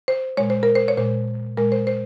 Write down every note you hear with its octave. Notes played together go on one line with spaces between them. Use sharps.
C5
A#2 G#3 C#5
C5
A#4
C5
C#5
A#2 G#3 C5
A#2 G#3 A#4
C5
C5